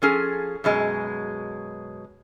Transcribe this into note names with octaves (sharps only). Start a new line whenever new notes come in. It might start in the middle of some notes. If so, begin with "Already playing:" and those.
F3 C#4 G#4 A4
F#2 B2 G#3